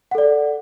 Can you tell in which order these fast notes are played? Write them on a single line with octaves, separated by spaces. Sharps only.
F#5 A4 D5